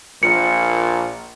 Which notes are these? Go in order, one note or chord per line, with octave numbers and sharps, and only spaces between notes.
A#1 A#2 A#3 C#7